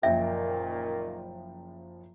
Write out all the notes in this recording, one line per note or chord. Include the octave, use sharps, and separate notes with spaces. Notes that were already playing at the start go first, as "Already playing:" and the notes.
F#1 A#2 D#3 F3 E5 G5